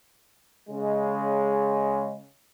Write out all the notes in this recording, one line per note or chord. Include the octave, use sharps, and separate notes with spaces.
C#3 G#3